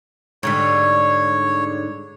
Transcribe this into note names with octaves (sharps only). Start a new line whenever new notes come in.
G#2 D3 G3 C#5